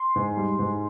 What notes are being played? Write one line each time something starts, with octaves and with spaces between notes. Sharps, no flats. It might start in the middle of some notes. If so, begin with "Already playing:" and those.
Already playing: C6
G#2
G3
G#2